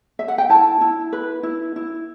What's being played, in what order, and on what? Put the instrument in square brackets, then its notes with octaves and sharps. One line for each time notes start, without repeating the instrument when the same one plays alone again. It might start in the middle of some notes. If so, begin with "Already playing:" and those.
[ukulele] E5
F#5
G5
E4 A5
E4
B4
E4
E4